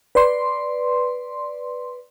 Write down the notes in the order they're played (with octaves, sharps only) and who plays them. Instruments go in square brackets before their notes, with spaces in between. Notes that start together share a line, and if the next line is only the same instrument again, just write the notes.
[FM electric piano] B4 D5 C6